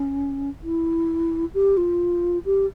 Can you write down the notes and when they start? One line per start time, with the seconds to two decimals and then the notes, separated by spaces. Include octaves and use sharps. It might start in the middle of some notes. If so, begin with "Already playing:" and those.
Already playing: C#4
0.63 E4
1.54 G4
1.77 F4
2.45 G4